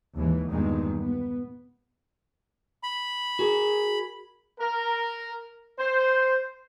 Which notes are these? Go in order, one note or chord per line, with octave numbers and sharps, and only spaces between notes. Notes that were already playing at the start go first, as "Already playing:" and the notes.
D#2 G#2 E3
E2 G2 A#2 D#3 G#3
B3
B5
F#4 G#4 A#4
A#4
C5